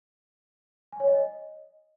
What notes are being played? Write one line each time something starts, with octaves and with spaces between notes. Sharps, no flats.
G#5
C#5
D#5